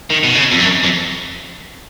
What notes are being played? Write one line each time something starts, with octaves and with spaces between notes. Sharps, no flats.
D#3
B2
C#3
F2
F#2
F2